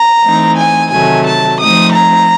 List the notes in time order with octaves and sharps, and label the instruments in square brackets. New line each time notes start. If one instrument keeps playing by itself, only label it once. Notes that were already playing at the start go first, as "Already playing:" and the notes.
Already playing: [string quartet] A#5
E3 A3 C4 D#4
G#5
C3 D#3 F#3 A3 G#5
A5
F3 A3 C4 D#4 D#6
A#5